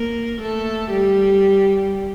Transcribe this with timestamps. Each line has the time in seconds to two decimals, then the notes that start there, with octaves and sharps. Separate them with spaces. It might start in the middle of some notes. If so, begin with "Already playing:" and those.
Already playing: A#3 A#4
0.41 A3 A4
0.92 G3 G4